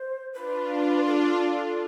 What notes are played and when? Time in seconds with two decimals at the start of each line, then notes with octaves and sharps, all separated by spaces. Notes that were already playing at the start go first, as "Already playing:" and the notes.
Already playing: C5
0.34 D4 F4 B4
1.06 A4